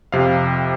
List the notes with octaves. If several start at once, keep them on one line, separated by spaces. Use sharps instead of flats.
F2 C3 F5